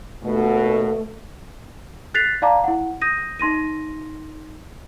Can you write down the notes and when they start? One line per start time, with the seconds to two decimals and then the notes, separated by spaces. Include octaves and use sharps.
0.22 D#2 B2 A3
2.14 F#6 A6 B6 C7 F7
2.42 D5 F5 A5 A#5 D6
2.64 E4 F#5
3.01 D#6 G6 A#6 D#7
3.39 D#4 C6 A#6 D#7